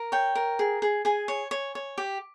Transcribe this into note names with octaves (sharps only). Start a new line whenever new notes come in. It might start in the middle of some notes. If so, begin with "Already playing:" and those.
Already playing: A#4
C#5 G5
A#4
G#4
G#4
G#4 G#5
C#5
C#5
C#5
G4